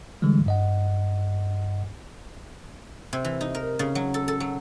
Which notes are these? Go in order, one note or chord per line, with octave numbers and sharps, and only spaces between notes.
D3 E3 G3 G#3
G2 D#5 F#5
C3
E3
D#4
A#4
C#3
F#3
A4
A4
F#3